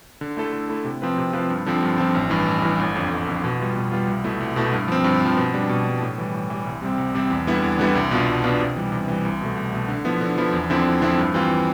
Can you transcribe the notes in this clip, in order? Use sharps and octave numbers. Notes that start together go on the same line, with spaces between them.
D3
A3 E4 A4
D3
A3 E4 A4
C3
F3 C4 F4 B4
C3
F3 C4 F4 B4
G2
D3 F3 C4
G2
D3 F3 C4
A1
G2 E3
A1
G2 E3
G1
F2 D3
G1
F2 D3
B2
G3 B3 F4
B2
G3 B3 F4
C2
B2 A3 E4
C2
B2 A3 E4
G2
F3 C4
G2
F3 C4
B2
G3 D4
B2
G3 D4
A2
E3 G3
A2
E3 G3
C2
C3 G3 C4
C2
C3 G3 C4
E2
D3 G3 B3 E4
E2
D3 G3 B3 E4
C2
B2 B3 D4 F4
C2
B2 B3 D4 F4
C3
E3 G3
C3
E3 G3
C2
B2 A3
C2
B2 A3
D3
F3 B3 E4
D3
F3 B3 E4
E2
D3 F3 C4 E4
E2
D3 F3 C4 E4
G2
E3 G3 C4 F4